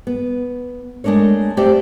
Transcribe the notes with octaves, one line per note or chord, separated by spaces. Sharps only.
B3
G#3 A3 D4 A#4 C#5
A3 C4 G4 C5 D5 F#5